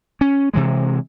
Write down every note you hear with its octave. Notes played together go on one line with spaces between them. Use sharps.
C#4
C3 E3 G#3